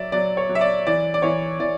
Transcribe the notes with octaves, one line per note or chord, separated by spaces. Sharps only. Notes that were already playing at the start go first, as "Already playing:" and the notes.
Already playing: F#3 D5 E5
F#3 D5
C#5
F#3
E5
D5
E3 D5
D5
E3 C#5
E3 D5